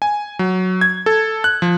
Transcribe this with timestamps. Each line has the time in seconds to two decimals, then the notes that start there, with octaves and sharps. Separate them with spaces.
0.02 G#5
0.39 F#3
0.81 G#6
1.06 A4
1.44 F#6
1.62 F3